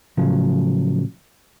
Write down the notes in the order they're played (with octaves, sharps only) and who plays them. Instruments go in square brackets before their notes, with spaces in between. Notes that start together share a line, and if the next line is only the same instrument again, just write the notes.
[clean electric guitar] A2 C#3 F3 F#3